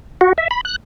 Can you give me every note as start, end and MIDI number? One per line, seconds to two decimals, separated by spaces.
0.21 0.33 66
0.38 0.48 76
0.51 0.61 83
0.65 0.76 90